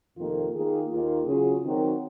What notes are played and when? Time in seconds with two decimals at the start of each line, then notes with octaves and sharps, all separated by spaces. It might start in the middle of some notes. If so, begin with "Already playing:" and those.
0.17 F2 C3 D#3 A#3 F4
0.54 D#3 A#3 F4 G#4
0.90 D#2 D#3 A#3 F4
1.26 C#3 F#3 C#4 F4 G#4
1.63 D#3 F#3 C4 F#4 A#4